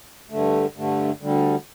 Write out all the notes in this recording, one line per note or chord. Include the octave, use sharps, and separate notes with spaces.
G2 D3 A3
G2 D3 A3
D2 D3 G3